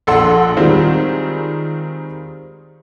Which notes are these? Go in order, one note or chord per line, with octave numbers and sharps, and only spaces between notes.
A#1 A4 F#5 C6
D#3 G3 G#3 C4 F4